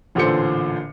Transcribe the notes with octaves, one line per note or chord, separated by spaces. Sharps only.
A1 A#2 D3 A4 C5 C#7